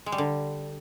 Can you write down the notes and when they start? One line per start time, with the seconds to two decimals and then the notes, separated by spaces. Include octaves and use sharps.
0.06 G#3
0.12 G3
0.18 D3